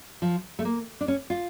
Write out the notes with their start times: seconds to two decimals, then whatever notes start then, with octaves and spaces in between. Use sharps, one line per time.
0.22 F3
0.59 A3
0.65 A#3
1.01 D4
1.08 C#4
1.30 F4